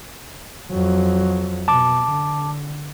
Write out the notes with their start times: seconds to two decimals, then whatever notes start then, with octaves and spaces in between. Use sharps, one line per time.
0.72 F2 F#3
1.68 B2 A5 D6
2.10 D3